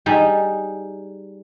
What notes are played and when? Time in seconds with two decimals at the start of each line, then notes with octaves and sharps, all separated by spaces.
0.06 G3 D#4 G#4